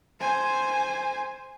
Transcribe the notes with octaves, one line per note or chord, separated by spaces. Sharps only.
C5 G#5